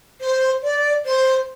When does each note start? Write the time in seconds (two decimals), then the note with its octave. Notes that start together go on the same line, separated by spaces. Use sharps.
0.21 C5
0.63 D5
1.05 C5